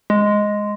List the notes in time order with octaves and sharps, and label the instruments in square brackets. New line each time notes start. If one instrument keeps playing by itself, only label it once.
[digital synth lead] G#3